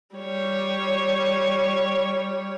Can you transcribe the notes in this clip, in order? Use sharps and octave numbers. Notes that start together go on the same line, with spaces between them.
G3 C#5